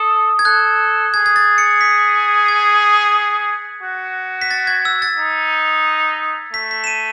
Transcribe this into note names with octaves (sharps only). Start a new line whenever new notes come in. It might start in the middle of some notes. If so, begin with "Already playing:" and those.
Already playing: A4 D#6
G#6
A4 F#6
G#4 G#6
G#6
A6
C#7
B6
G#6
F#4
B6
A6
G#6
E6
A6
D#4
A3 B6
B6
E7
D#7